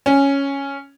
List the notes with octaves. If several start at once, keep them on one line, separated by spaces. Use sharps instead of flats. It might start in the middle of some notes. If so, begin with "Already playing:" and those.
C#4